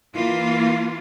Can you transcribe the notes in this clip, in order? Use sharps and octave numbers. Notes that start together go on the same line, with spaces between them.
E3 A#3 F4